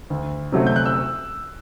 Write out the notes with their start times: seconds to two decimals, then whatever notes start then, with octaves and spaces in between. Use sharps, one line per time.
0.10 D2
0.52 C3 F#3 A3 C4
0.67 G6
0.76 F#6
0.86 E6